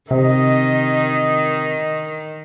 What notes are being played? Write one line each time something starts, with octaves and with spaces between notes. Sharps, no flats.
C3 D#3 D#5